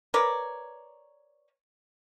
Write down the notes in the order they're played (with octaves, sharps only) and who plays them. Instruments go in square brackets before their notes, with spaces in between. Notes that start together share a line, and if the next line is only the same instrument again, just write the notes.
[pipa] A#4 B4 C#5 D5